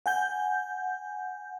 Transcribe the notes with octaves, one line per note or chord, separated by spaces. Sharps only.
F#5 G#5 G6